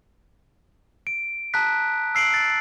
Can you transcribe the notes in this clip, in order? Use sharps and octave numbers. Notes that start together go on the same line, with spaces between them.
D7
A5 A#5 D#6 F#6 B6
E6 C7 D7 F#7
A6